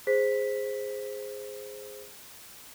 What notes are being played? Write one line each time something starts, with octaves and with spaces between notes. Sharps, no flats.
G#4 C5 B6